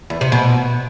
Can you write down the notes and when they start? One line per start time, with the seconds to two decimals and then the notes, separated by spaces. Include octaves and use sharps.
0.10 E2
0.21 C3
0.32 B2